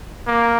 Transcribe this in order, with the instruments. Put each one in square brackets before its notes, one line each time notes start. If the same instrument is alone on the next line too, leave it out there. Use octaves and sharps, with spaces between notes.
[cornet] A#3